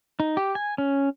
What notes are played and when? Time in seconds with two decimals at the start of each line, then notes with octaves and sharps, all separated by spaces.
0.20 D#4
0.37 G4
0.55 G#5
0.78 C#4